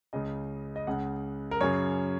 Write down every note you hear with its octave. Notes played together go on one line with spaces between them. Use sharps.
C#2 C#3 D#5
D#5
C#2 C#3 F#5
A#4
F#2 C#3 C#5